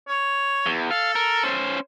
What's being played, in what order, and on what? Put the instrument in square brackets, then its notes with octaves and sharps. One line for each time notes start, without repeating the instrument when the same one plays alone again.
[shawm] C#5
[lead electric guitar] E2
[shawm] A4 [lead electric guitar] F5
[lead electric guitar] A#4
C#4 C5